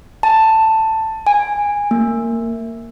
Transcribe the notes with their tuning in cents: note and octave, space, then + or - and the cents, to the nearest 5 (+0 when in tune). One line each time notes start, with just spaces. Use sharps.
A5 +10
G#5 -15
A#3 -20